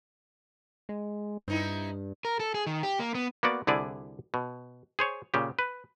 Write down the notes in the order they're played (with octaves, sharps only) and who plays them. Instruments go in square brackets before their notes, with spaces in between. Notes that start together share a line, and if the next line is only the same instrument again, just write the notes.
[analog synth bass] G#3
[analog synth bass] G2 [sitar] C4 D#4 E4
[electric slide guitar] A#4
A4
G#4
D#3
G4
A#3
B3
[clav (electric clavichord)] A#3 B3 F#4 D5
C2 D3 E4 G#4 D5
B2
G#4 C5 C#5
A#2 C#3 G4
B4